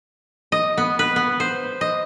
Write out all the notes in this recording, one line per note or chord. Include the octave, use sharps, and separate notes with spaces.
D#5
B3
B4
B3
C5
D#5